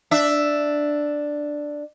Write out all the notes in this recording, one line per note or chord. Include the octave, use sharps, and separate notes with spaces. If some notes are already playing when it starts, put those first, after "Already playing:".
D4 E5